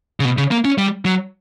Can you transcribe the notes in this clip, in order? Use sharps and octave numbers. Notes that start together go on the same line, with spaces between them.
C#3
B2
C#3
A#3
C#4
G3
F#3